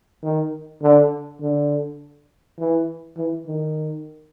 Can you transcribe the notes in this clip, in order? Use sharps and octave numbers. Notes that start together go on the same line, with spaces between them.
D#3
D3
D3
E3
E3
D#3